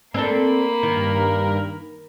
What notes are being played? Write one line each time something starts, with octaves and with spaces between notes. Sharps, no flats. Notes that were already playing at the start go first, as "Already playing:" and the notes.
A#3 C4 D4 A4 B5
G2 D#3 A#4